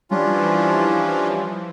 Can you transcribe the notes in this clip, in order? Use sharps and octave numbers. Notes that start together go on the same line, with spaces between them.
E3 F3 G3 C#4 D4 F4